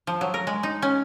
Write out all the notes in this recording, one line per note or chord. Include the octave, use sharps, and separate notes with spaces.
F3
F#3
A#4
G#3
D#4
C#4